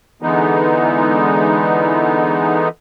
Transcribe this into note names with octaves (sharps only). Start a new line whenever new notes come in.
D3 E3 G#3 B3 D#4